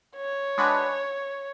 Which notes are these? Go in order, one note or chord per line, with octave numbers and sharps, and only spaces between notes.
C#5
G#3 D4 F#4 B4